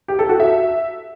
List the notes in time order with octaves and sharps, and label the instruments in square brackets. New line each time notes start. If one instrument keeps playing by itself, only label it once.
[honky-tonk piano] G4
A4
F#4
E5